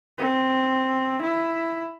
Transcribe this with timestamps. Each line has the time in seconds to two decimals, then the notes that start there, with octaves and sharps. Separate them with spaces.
0.18 C4
1.22 E4